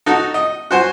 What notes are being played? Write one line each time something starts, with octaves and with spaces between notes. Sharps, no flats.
D#4 F#4 A4
D#5
F#4 C5 G#5